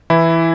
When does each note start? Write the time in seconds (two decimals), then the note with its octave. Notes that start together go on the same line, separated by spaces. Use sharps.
0.10 E3 E4